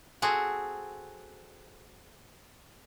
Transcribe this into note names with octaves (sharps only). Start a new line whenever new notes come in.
C4 F#4 G#4 A4